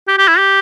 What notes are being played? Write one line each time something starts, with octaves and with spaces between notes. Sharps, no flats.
G4
G4
E4
G4